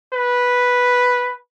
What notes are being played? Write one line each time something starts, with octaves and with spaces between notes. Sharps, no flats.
B4